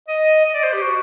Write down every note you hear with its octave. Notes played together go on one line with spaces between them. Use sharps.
D#5
D#5
D5
C5
G4
F#4